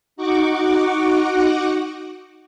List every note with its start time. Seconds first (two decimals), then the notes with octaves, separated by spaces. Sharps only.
0.16 D#4 F#4 F#5 C#6 D6